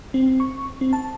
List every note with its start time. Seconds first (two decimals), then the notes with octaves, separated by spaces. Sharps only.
0.14 C4
0.40 C#6
0.81 C4
0.93 A5